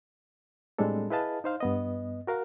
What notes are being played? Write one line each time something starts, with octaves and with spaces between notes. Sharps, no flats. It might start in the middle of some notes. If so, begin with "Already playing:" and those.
A2 G3 G#3 C4 D4 A4
E4 G#4 B4 D#5 F5 A5
D#4 C5 F5
G2 B3 D#5
F#4 A#4 F5 F#5